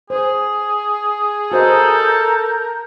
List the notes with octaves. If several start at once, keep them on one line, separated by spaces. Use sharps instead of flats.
G#4 C5
F#4 A4 A#4 C5 D#5 A#5 G6